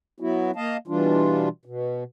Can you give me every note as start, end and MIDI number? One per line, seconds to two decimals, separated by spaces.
0.20 0.51 54
0.20 0.51 59
0.20 0.51 64
0.20 0.51 66
0.56 0.77 58
0.56 0.77 75
0.56 0.77 77
0.56 0.77 81
0.88 1.49 47
0.88 1.49 52
0.88 1.49 55
0.88 1.49 62
0.88 1.49 65
1.65 2.04 47